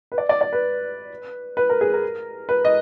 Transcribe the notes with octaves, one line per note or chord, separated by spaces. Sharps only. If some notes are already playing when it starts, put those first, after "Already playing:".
B4
D5
D5
D5
B4
B4
A#4
G#4
A#4
B4
D#5